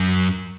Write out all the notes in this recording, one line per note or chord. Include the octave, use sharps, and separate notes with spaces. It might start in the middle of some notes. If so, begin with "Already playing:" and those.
Already playing: F#2